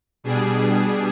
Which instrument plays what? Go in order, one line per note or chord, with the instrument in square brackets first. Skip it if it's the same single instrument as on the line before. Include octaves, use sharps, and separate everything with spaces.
[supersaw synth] B2 G3 D4 G#4